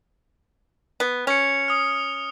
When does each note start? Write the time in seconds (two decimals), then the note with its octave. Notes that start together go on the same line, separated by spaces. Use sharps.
1.00 B3
1.27 C#4 C#7 F7
1.68 D#6 F6